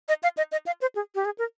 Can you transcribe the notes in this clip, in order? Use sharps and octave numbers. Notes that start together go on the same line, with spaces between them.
D#5
F5
D#5
D#5
F5
C5
G#4
G4
G#4
A#4